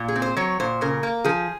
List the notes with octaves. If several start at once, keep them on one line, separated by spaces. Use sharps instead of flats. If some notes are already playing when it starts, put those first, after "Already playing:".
Already playing: A#2
G#4
C4
C5
F#3 C#5
A#2 C5
C#3 A#4
A#3
F3 G#4